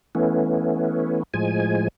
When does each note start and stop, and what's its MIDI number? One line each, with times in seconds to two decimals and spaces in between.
0.15 1.23 52
0.15 1.23 57
0.15 1.23 59
0.15 1.23 61
1.34 1.88 45
1.34 1.88 53
1.34 1.88 56
1.34 1.88 80